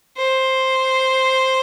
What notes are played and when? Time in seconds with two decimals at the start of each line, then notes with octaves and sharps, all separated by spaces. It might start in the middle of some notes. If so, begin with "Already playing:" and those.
0.17 C5